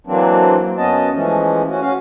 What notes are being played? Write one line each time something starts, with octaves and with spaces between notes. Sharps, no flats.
E3 F#3 A#3 C4 D4
F#2 B3 C#4 F#4 D#5 A5
E3 F3 G#3 A3 C#4
C#4 F#4
C#4 F#4 F5